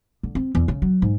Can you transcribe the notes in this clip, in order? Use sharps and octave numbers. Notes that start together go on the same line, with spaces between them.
D3
C4
E2
C#3
F#3
G#2